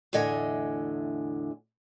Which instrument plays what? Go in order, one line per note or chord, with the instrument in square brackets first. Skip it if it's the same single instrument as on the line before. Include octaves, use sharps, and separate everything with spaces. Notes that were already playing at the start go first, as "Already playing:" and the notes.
[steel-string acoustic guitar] E2 A2 D3 D#5 E5 G#5